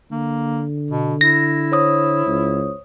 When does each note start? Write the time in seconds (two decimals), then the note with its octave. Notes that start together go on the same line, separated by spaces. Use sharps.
0.11 D3 A#3
0.90 B2
1.21 E4 A#6
1.72 C5 C#5 D#6
2.27 C#2